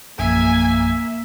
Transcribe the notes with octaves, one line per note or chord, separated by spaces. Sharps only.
A#1 F#2 A#3 E5 G#5